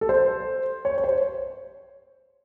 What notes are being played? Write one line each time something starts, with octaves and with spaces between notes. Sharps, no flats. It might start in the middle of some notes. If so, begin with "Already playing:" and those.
A4
C5
C#5
C#5
C5